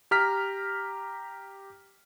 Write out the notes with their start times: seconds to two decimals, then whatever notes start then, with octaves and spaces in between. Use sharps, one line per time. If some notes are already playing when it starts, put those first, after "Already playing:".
0.11 G4 A#5 F6 B6